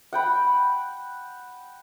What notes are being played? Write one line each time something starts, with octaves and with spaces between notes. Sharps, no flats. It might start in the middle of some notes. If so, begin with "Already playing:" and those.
F#5 G5 B5